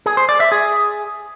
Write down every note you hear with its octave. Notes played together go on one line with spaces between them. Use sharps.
G#4
C5
D5
E5
G#4